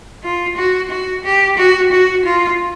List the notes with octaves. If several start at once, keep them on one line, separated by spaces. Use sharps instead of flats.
F4
F#4
F#4
G4
F#4
F#4
F4